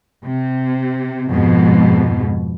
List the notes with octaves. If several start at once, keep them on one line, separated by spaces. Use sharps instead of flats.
C3
F2 G#2 B2